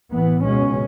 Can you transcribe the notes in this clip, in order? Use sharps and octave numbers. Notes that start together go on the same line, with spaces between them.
A1 A2 E3 B3
C#2 B2 G#3 C#4